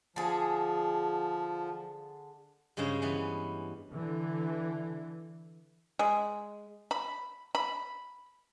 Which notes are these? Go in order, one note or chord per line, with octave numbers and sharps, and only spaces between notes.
D3 F3 G#4
G2 C#3 G#3 C#4 C5
E3 B3 C#4
D3 E3
G#3
B5
B5